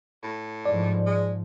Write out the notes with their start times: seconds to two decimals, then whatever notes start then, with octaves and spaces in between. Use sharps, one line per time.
0.23 A2
0.65 G#2 F3 D5
1.06 G#3